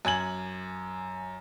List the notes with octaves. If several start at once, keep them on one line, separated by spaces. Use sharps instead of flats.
F#2 G#5 G#6 F#7